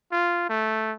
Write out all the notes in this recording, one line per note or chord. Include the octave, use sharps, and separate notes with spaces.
F4
A3